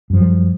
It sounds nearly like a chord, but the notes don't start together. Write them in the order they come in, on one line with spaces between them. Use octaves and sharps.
F#2 F3 G3